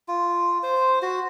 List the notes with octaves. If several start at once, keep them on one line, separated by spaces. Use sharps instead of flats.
F4
C5
F#4